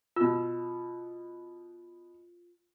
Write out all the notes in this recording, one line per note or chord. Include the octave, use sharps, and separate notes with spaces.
B2 F4 E6